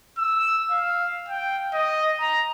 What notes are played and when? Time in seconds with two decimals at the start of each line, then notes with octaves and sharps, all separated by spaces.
0.18 E6
0.71 F5
1.29 G5
1.74 D#5
2.21 A#5